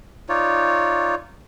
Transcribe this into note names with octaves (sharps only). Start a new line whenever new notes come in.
D#4 F4 C#5 D5